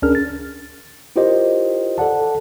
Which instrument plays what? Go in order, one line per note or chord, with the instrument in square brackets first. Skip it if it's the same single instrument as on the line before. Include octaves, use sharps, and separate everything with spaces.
[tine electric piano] D2 C#4 D4 G#4 A#4 F6
A6
E4 F4 G4 A#4 C5 D#5
A4 D5 F#5 A5